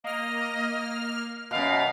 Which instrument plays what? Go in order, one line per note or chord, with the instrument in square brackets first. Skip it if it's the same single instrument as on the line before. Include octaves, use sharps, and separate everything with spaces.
[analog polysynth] A#3 F6 [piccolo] D#5
[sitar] F#2 B2 [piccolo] F5